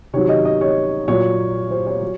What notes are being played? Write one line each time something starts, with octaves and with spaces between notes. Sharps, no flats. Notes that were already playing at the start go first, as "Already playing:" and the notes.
C3 D#3 F#3 C#5
D#5
D#5
C#5
A#2 F#3 C#5
C5
C#5
F#3